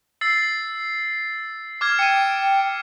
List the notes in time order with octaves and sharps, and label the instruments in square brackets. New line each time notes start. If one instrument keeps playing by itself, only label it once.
[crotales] E6 A6 C7
D6 F6 G#6
[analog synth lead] G5 [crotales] C#7 D#7